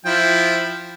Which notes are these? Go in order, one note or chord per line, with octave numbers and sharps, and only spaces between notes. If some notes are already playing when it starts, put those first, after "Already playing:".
F3 E4 G5